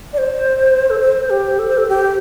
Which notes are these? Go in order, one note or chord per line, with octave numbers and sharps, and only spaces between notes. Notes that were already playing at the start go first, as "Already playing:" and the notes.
D5
C5
A4
C5
G4
A4
C5
A4
G4